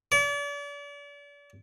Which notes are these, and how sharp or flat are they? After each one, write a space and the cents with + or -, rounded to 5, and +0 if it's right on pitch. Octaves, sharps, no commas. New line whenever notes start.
D5 -40